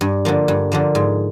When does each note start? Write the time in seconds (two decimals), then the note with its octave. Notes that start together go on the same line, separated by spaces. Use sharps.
0.01 G2
0.25 D3 F3 A#3
0.48 G2
0.72 D3 F3 A#3
0.95 G#2